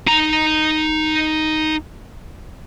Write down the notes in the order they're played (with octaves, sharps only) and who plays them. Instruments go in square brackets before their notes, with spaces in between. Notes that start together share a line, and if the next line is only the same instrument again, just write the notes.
[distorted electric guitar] D#4 A#5